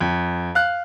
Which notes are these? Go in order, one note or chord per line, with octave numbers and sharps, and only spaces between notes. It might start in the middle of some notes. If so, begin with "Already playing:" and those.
F2
F5 F#6